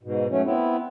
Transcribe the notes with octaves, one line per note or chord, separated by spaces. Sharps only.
G#2 B2
F#3 A3 C#4
B3 C4 E4